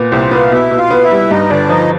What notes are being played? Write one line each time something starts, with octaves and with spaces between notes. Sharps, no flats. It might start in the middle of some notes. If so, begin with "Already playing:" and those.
Already playing: A#2 B3
C2 C4 C5
B3 F4 F5
B2 E4 E5
B2
F4 F5
B3
E4 E5
G3
G2 D#4 D#5
G1 D4 D5
F3 D#4 D#5